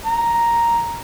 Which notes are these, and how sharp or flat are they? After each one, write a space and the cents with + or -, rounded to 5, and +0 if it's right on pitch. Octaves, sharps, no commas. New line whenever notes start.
A#5 +0